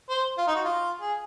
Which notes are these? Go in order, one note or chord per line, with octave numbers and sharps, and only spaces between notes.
C5
F4
D#4
F#4
F4
G#4